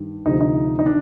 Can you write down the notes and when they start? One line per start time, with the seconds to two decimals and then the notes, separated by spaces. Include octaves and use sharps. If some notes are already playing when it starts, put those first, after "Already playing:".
Already playing: G2 D#3
0.26 D2 C3 F3 D#4
0.41 D#4
0.79 D#4
0.85 D#3 D4